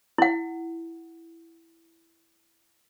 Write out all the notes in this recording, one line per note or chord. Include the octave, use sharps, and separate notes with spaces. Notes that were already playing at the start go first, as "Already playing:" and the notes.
E4 F#5